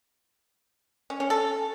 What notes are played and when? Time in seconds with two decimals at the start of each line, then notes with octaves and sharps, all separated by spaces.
1.10 C#4
1.20 C#4
1.30 A4